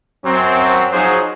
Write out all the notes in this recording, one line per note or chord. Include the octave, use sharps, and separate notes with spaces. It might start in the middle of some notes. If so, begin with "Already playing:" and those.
F#2 F#3 C4
F3 F#3 D#4 F#4 G#4 C5